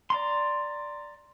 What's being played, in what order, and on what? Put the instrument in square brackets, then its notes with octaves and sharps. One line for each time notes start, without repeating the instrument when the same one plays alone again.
[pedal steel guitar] D5 A#5 C6